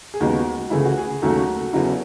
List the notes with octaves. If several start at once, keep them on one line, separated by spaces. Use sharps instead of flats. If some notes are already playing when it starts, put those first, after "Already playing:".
G#4
D#2 C#3 G#3 B3 F#4
C#2 C#3 E3 A3 E4 G#4
F#4
G#4
D#2 C#3 F#3 A3 F#4 A4
E2 C#3 F#3 C#4 E4